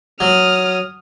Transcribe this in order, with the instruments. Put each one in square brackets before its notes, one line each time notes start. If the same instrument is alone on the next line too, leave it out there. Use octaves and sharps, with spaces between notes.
[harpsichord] F#3 [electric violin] D#6 F6